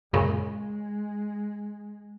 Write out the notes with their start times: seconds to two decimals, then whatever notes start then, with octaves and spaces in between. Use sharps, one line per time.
0.13 F#2 A#2 C#3 G#3